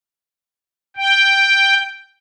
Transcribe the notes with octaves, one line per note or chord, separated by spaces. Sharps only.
G5